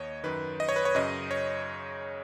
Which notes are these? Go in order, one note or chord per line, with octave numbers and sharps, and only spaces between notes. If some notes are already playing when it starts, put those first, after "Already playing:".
Already playing: D#2 C#5 D#5
F#2 D#3 B4
D#5
C#5
B4
C#5
F#2 C#3 D#5
C#5